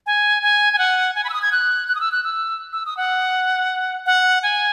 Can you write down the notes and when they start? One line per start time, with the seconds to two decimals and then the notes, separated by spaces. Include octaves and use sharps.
0.06 G#5
0.43 G#5
0.73 G#5
0.78 F#5
1.16 G#5
1.24 B5
1.29 E6
1.34 D#6
1.42 G#6
1.52 F#6
1.88 F#6
1.95 D#6
2.01 E6
2.12 F#6
2.24 E6
2.73 E6
2.86 D#6
2.97 F#5
4.06 F#5
4.43 G#5